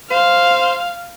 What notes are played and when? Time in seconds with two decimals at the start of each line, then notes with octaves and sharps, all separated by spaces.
0.11 C5 F5